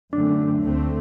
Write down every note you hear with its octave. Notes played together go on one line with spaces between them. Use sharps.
F#2 D3 A3 C4 D4
D2 D3 A3 C4